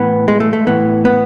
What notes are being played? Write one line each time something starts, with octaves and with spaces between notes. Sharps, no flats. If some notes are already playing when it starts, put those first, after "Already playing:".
Already playing: A2 E3 B3
G#3
A3
A3
A2 E3 B3
B3